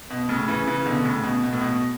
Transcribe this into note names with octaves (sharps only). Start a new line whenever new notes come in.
B2
A2 C#3
C#3 E3
C#3 E3
B2 D3
A2 C#3
B2
B2
A2
B2